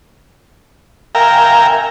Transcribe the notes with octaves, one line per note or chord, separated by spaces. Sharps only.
A#4 E5 F5 G5 G#5 A#5